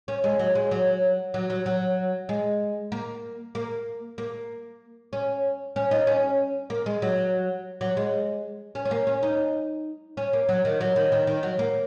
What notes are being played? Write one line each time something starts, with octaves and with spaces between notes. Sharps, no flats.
C#4
G#3
F#3
G#3
F#3
F#3
F#3
F#3
G#3
A#3
A#3
A#3
C#4
C#4
D#4
C#4
A#3
G#3
F#3
F#3
G#3
C#4
C#4
A#3
C#4
D#4
C#4
A#3
F#3
D#3
F#3
D#3
D#3
D#3
F#3
A#3